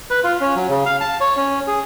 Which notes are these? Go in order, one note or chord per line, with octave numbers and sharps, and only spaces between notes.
B4
F4
C#4
F#3
C#3
F5
A5
C#5
C#4
G#4